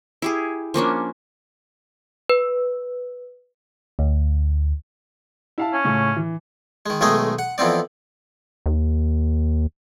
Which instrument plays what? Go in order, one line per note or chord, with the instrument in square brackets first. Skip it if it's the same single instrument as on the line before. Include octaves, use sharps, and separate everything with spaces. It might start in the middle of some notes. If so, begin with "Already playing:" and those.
[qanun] E4 G4 G#4
F3 A#3 C#4 D4
[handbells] B4
[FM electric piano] D2
[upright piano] E4 F5 A5
[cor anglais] C#4
[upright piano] C#2 A2 C#6
E3
[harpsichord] D#3 G#3
B1 D#3 G#3 A3 G#4 D#5
F#5
F2 E3 B3 C4 D5
[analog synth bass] D#2